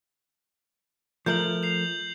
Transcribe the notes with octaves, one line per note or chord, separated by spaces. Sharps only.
F3 A3 A#4 G6 F7 F#7
C7 F7